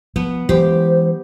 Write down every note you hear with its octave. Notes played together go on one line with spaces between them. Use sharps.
F3 B3
E3 F#3 G#3 G4 C5